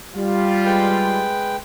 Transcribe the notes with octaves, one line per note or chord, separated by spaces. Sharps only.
G3 F4
G#3 B4 G5